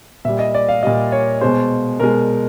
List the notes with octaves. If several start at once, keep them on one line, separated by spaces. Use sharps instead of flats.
A#2 G3 E5
D#5
D5
F5
A#2 G3 D#5
C#5
B2 G#3 C5
B2 G#3 A#4